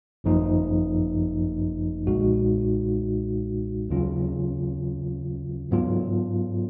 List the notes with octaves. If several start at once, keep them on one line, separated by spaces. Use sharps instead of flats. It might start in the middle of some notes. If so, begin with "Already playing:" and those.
G#1 F#2 F3 A#3 D#4
B1 A#2 G#3 D#4 F#4
D#2 C#3 F#3 C#4 F4
G#2 F#3 B3 F4